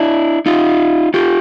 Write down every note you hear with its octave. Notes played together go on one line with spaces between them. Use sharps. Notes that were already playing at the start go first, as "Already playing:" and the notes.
Already playing: D4 E4
D#4 F4
F4 G4